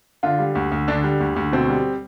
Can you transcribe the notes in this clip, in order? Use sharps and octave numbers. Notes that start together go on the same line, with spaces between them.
D3 F4
G3
D2
D2
D3 D4
G3
D2
D2
B2 C4
G3